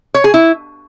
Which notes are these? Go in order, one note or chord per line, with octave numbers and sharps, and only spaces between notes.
C#5
G#4
E4